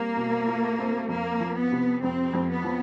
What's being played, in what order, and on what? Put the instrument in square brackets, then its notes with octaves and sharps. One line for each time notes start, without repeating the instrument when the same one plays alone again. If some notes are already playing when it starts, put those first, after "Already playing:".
Already playing: [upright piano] G3 C4 [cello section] A#3
[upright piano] B2
F4
C4
[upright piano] F2 [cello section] A#3
[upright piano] F3
[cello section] B3
[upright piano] C3
[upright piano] F2 [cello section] C4
[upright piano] F2
[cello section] B3
[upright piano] F3